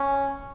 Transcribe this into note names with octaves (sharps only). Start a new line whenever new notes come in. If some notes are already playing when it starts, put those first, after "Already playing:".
Already playing: C#4